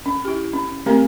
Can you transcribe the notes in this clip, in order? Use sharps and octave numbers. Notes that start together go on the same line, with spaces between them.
C#4
E4 G4
C#4
A3 B3 C4 G4 A#4 F5